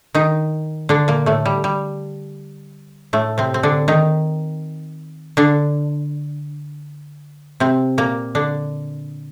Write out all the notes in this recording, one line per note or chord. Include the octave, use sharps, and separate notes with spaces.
D#3 D#4
D3 D4
A#2 A#3
A2 A3
G3
G3
A2 A3
C3 C4
C4
D3 D4
D#3 D#4
D3 D4
C3 C4
A#2 A#3
D3 D4